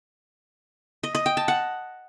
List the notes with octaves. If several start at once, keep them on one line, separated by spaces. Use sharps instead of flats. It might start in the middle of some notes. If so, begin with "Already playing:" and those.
D#5
D#5
G5
A5
F#5